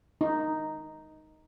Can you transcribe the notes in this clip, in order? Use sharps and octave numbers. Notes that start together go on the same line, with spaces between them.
D#4